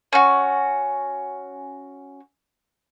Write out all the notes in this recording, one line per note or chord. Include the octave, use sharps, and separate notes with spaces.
C#4 F#4